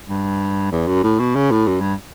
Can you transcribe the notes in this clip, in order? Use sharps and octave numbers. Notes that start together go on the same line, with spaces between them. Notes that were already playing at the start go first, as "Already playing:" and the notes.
G2
E2
F#2
A2
B2
C#3
A2
F#2
G2